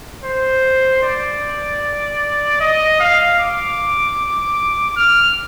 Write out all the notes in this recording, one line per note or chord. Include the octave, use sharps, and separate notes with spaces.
C5
D5
D#5
F5
D6
F6